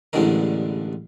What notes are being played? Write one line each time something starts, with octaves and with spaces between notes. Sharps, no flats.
A1 E2 G2 D3 G#3 A#4